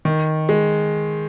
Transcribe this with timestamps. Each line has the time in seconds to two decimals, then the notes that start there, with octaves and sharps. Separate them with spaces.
0.05 D#3
0.49 G#3